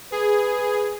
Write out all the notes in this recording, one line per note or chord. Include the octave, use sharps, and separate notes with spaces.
G#4 B4